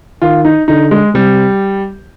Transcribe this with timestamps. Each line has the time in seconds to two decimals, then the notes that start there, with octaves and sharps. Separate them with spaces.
0.22 D#3 F4
0.45 D#4
0.68 D3 D#4
0.91 G#3
1.14 C3 G3